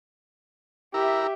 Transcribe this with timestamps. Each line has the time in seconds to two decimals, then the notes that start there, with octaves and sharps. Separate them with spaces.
0.94 E4 G4 A#4 E5